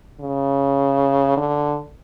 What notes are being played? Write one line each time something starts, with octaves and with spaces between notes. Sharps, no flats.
C#3
D3